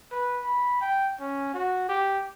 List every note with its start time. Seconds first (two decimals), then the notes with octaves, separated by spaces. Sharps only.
0.12 B4
0.44 B5
0.81 G5
1.20 C#4
1.54 F#4
1.89 G4